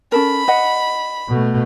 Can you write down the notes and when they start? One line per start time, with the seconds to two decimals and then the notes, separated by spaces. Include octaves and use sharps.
0.12 C#4 A4 A#4 B5
0.48 D#5 F#5
1.29 B2 A3